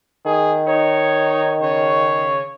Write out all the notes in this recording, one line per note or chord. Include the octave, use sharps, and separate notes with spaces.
D#3 G#4
D#4 C#5
C#3 C#5